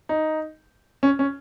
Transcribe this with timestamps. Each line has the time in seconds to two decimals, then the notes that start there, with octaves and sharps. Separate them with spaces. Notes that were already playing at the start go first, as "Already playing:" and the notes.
0.09 D#4
1.03 C#4
1.19 C#4